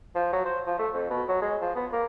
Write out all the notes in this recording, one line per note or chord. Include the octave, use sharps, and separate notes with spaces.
F3
F#3
C5
F3
A3
F2
B2
F#3
G#3
F3
B3
A#3